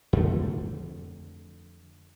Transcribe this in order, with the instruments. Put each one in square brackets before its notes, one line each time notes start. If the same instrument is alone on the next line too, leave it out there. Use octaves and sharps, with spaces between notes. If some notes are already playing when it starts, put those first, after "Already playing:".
[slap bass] F2 D3 A3